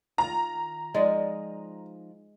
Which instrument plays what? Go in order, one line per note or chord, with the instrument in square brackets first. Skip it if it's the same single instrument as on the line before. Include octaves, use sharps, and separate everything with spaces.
[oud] D#3 F4 [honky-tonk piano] A#5
[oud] F3 D#4 D5 [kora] G#3